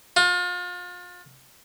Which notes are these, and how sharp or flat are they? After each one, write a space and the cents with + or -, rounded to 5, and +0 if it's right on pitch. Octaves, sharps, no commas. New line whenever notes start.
F4 +35